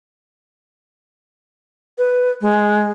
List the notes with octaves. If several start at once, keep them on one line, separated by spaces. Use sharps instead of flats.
B4
G#3